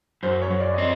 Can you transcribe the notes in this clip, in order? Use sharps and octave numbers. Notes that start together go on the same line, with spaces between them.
F#2 C5
C#5
F#2
D5
C4 D#5